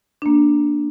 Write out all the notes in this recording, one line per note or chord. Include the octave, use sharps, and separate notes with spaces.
A#3 D4